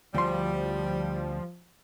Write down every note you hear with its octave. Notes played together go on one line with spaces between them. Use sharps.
D2 F3 G3 C6